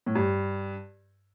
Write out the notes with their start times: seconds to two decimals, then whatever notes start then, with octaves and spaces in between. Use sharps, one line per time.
0.06 A2
0.15 G2